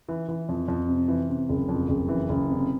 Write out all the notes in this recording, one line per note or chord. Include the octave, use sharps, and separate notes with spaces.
E3
E3
F2
F2
C3
E3
C3
F#1
F2
F#1
E3
F#1
C3